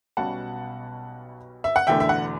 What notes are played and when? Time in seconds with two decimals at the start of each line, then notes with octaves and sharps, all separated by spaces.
0.17 B1 B2 G3 C#4 F#5 A5
1.64 E5
1.76 F#5
1.87 E1 E2 D3 A3 E5 G5
2.00 E5
2.09 F#5